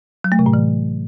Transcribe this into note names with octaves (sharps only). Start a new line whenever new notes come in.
F#3
A3
C3
A2
E3